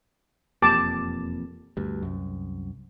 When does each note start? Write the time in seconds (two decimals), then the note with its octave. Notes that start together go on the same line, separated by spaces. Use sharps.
0.62 E1 F2 A#3 G4 A5 D6
1.77 D2 G2
2.02 C2 F#2